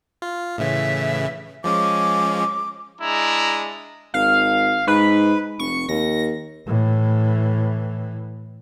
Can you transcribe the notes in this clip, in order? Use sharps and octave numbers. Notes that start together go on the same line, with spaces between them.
F4
A2 C#3 E3 E5
F3 G#3 C#4 D6
G#3 D4 E4 A#5
G#1 F5
G#2 B4
F1 C#6
D#2 A#6
A2 E3